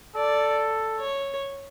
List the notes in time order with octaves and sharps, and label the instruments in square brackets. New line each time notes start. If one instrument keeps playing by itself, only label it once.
[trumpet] A4 [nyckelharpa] D5
[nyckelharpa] C#5